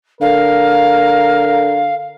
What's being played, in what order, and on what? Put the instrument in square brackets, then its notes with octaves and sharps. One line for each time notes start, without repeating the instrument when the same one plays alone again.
[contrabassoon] D3 [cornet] A#4 [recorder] F5